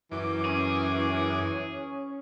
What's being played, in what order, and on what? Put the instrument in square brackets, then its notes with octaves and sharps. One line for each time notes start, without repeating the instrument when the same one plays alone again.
[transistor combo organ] F#2 D6 [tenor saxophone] E3
[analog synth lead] C#4 [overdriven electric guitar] G#4